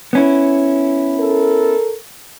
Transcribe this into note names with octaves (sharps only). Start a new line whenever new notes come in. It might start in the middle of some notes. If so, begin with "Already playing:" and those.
B3 C#4 E4
A4 A#4